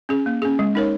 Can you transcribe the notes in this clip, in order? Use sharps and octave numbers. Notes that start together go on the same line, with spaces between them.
C#4 G#4
A#3
C#4 G#4
G#3
D#4 A#4 C#5